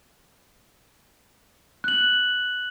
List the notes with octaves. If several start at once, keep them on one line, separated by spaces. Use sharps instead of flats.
F#6 F#7